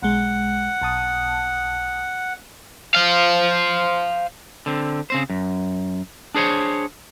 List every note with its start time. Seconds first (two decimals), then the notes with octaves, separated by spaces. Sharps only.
0.03 B1 G#3 F#5
0.82 B1 A5 D#6
2.95 C5 F5
4.66 D3 C4
5.10 C#3 C4 C5
5.30 F#2
6.35 D4 G#4 C5 C#5